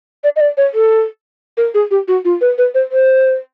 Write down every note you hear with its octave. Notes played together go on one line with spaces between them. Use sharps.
D5
D#5
D5
C#5
A4
A#4
G#4
G4
F#4
F4
B4
B4
C5
C5